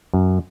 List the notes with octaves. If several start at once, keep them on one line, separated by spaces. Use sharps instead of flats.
F#2